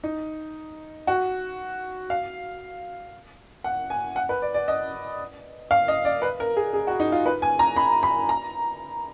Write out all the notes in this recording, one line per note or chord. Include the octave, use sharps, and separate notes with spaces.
D#4
F#4
F5
F#5
G#5
F#5
B4
D5
D5
D#5
F5
D#5
D5
B4
A#4
G#4
G#4
F#4
D#4
F4
B4
G#5
A#5
B5
B5
A#5